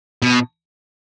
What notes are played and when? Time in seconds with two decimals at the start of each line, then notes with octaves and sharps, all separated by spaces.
0.22 B2